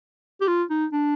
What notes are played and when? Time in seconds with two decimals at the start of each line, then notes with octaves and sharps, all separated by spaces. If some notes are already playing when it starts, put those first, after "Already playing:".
0.41 G4
0.48 F4
0.70 D#4
0.93 D4